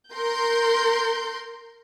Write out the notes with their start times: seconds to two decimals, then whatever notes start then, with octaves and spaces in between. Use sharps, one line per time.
0.13 A#4 C6 G6